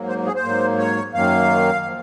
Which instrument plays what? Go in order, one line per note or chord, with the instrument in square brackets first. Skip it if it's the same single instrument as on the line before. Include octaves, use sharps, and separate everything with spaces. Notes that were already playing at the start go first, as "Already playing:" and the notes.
Already playing: [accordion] G#2 F#3 A#3
C5
G#4
C5
G#2 F#3 A#3
C#5
F#2 D#3 F#3 A#3 F5
F3 A#3